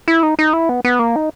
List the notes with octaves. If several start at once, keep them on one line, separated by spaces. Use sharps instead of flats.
E4
D#4
D#4
E4
B3
B3
A#3
D#4